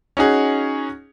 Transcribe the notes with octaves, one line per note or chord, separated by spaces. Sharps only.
C#4 D#4 F#4 G#4